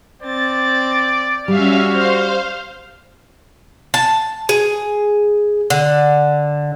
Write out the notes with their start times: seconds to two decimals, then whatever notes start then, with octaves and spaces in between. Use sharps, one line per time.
0.22 C4 D5 A6
1.48 G3 C#4 F#4 E5 F5 F6
1.91 C5 F5
3.94 A5
4.49 G#4
5.70 D3